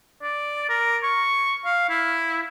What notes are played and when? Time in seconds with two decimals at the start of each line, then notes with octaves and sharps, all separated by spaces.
0.22 D5
0.69 A#4
1.03 C#6
1.65 F5
1.89 E4